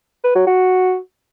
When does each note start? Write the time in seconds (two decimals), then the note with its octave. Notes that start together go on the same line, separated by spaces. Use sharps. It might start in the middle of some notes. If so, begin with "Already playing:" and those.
0.24 B4
0.35 F#3
0.47 F#4